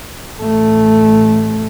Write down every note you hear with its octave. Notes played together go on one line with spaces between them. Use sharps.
A1 A3